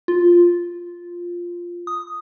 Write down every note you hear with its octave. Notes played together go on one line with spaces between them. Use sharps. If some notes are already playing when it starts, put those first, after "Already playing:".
F4
D#6